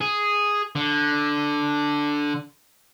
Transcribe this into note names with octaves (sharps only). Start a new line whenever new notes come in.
G#4
D3